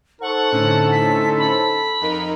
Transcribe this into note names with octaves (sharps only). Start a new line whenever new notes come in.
D#4 A4 C5 F#5 C#6
A2 D3 C#4
B6
B5
F2 D#4 A#4